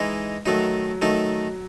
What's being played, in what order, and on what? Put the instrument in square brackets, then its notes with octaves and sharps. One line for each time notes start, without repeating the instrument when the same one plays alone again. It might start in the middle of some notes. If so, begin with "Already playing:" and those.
Already playing: [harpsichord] E3 G#3 D#4
[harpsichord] D#3 A3 D#4 [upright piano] F#3
[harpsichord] D#3 A3 D#4 [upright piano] F#3